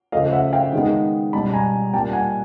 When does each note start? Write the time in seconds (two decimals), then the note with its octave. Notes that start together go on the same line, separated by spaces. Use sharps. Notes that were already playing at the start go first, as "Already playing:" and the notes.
0.12 C#3 F3 A3 D#5 F5
0.33 E5 F#5
0.53 F5 G5
0.73 D#3 G#3 B3
1.33 B2 G3 B3 A5 B5
1.54 G#5 A#5
1.93 A#2 G3 A#3 G5 A5
2.13 F#5 G#5